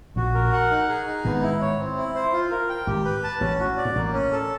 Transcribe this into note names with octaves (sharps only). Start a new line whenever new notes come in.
A#1 A#2 F#4
A#4
F#5
D#4
G#4
D#4
G#1 G#2 B3
E4
C#5
C4
E4
C5
F4
A#4
G5
G#1 G#2 G4
B4
A5
A1 A2 C#4
F#4
D5
G#2
A1 A2 A#3
C#4
A4